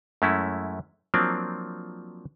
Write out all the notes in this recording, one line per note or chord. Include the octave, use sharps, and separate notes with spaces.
F#2 G#3 A3 C#4 E4
F3 F#3 A#3 C4 D4